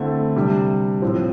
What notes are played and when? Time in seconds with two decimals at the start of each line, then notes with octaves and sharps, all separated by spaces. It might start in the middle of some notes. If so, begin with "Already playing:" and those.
Already playing: D3 A3 C4 E4
0.36 C3 G3 D4
1.02 A2 F3 C4